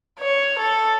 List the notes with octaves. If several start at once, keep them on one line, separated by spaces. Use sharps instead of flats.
C#5
A4